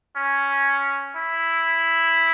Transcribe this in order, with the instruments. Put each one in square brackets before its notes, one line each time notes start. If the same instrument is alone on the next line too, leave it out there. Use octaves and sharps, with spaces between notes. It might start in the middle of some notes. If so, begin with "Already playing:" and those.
[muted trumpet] C#4
E4